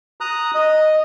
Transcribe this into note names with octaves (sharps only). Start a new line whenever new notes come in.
A#5 D#6 F#6
D#5